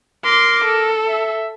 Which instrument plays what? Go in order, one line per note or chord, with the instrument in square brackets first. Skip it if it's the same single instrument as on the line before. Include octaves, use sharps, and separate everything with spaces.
[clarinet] A#4 [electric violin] C6 D6
[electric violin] A4
[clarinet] E5